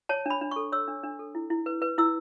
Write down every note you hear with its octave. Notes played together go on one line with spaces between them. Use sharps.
C#5 A5
D4 B5
D4
A4 C#6
C#5 E6
D4
D4
A4
E4
E4
B4
B4
E4 E6